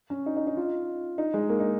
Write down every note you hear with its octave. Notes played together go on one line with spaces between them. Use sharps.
C#4
D#4
D#4
D#4
F4
D#4
G#3
A#3
D#4